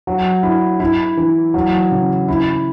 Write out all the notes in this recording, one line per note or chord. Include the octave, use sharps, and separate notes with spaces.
F#3
E4
E4
E3
F#3
C#3
E4